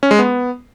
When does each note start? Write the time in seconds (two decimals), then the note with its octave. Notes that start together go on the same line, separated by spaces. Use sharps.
0.03 C#4
0.11 G#3
0.19 B3